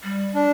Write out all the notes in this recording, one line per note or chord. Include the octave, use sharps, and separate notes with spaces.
G3
D4